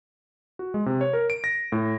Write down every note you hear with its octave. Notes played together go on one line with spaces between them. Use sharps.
F#4
G#3
C3
C#5
A#4
D7
A#6
A2